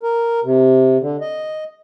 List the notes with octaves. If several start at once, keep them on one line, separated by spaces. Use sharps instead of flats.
A#4
C3
D3
D#5